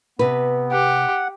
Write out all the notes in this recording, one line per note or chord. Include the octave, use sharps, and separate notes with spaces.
C3 B3 B4
G4 F#5